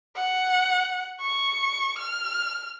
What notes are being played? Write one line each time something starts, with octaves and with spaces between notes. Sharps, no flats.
F#5
C#6
F6